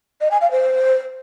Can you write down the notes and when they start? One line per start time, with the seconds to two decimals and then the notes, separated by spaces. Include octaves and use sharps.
0.21 D#5
0.31 G#5
0.41 F5
0.51 C5